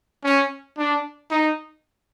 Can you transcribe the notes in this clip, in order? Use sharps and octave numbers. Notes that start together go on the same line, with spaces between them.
C#4
D4
D#4